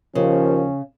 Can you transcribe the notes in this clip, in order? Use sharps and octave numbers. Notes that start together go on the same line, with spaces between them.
D#2 C#3 F3 C#4